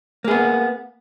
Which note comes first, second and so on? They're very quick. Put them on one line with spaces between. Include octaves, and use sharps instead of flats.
A#3 G#4 B3